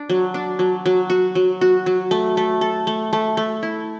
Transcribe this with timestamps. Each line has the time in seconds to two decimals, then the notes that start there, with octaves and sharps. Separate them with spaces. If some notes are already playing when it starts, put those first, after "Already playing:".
Already playing: D4
0.10 F#3
0.34 D4
0.59 F#3
0.86 F#3
1.10 F#4
1.35 F#3
1.61 F#4
1.86 F#3
2.11 A3
2.37 A3
2.61 A4
2.87 A3
3.13 A3
3.37 A3
3.63 E4